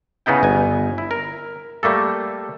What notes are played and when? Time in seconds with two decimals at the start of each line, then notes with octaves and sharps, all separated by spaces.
0.26 C#3 B3 D#4 E4 G5
0.43 G1 G#5
0.98 E4
1.11 A#4
1.83 G3 A3 A#3 A4